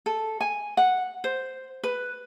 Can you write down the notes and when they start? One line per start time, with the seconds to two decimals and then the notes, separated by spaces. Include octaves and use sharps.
0.06 A4
0.40 G#5
0.77 F#5
1.24 C5
1.83 B4